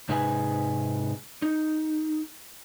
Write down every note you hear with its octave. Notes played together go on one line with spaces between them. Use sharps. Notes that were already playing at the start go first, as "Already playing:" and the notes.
G#2 C3 D#4 G#4 B4 G#5
D#4